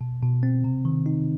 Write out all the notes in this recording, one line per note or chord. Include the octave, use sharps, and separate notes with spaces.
B2
B2
C4
C3
D#3
D#4